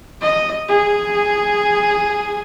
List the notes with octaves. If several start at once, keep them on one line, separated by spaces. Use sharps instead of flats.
D#5
G#4